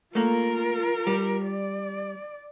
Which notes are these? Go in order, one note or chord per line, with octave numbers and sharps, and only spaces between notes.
A3 A#3 F4 A#4
G3
D5